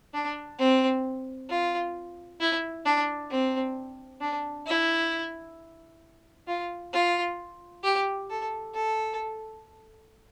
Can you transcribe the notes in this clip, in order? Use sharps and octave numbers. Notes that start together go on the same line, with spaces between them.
D4
C4
F4
E4
D4
C4
D4
E4
F4
F4
G4
A4
A4